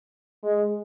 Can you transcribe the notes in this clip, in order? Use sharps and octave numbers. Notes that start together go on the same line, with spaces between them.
G#3